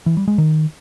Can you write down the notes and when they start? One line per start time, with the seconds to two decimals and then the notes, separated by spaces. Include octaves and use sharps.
0.06 E3
0.17 G3
0.28 G#3
0.38 D#3